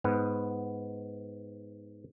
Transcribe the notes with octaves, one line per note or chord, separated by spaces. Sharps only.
G#2 B3